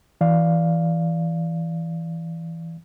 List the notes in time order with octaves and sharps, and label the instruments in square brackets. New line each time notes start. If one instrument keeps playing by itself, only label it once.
[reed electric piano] E3 D5 F5